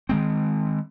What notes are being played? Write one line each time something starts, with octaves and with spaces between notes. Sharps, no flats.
D#3 G#3 C4